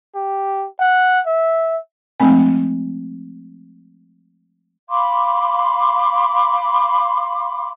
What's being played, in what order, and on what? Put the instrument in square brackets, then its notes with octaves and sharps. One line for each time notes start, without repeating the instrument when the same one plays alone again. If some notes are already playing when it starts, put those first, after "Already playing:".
[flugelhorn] G4
F#5
E5
[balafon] F3 G#3 A3 C4 G#5
[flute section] F5 B5 C6 D6